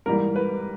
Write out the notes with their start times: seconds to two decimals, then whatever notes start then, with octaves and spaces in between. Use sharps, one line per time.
0.06 G#2 E3 G3 A#3 A#4
0.36 B4